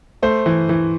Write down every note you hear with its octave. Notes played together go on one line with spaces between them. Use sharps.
A3 C5
E3
E3